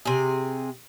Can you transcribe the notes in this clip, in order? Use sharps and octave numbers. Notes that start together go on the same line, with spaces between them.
C3 G#4